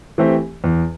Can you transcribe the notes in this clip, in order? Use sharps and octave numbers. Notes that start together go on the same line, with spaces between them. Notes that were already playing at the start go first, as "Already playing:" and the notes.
E3 A3 C4 G4
E2